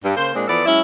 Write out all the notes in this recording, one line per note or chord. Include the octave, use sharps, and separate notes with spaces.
G2
C#3 A#3 C5
A#2 G#3 C4 D4
E3 F3 B3 A4 D5
F#3 G#3 C#4 E4